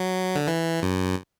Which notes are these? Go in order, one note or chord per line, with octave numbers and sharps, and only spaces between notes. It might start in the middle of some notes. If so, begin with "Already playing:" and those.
Already playing: F#3
D3
E3
F#2